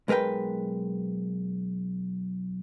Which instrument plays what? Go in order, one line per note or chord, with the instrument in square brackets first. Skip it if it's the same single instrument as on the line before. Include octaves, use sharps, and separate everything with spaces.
[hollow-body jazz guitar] B1 G#3 A#4 B4 G5